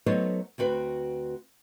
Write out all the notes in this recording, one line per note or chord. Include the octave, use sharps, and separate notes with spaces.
F#3 A3 B3 D#4 C5 C#5
D2 C4 F#4 B4